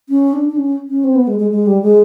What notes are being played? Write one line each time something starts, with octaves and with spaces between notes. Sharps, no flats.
C#4
D4
D4
C#4
C#4
C4
B3
G#3
G#3
G#3
G3
G#3